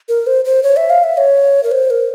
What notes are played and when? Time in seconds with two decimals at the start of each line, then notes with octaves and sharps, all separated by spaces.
0.08 A#4
0.26 C5
0.45 C5
0.63 C#5
0.76 E5
0.90 F5
1.03 E5
1.17 C#5
1.63 A#4
1.71 C5
1.90 A#4